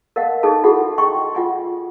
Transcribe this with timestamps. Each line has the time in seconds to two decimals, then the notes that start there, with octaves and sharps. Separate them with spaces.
0.16 A#4 D#5 F5 F#5 A5
0.43 D#4 G#4 A4 A5
0.64 E4 F#4 G#4 A4 F#5 B5
0.98 D#5 G5 A#5 C6 C#6
1.35 F4 F#5 G#5